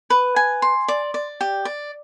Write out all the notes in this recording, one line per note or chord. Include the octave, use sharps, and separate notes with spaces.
B4
G#5
C6
D5
D5
G4
D5